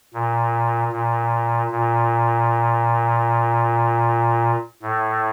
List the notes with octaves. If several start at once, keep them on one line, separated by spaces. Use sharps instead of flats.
A#2
A#2
A#2
A2